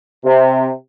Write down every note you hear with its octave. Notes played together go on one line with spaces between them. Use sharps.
C3